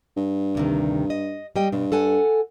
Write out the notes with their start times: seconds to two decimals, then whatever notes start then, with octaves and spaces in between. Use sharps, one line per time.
0.17 G2
0.55 D2 C3 D#3
1.10 D#5
1.56 G3 D#5 G5
1.72 G2 B2
1.92 A4 F#5 G#5